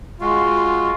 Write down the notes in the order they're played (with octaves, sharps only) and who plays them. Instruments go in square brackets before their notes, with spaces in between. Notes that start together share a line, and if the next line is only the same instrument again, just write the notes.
[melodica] G#3 F#4 [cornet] F4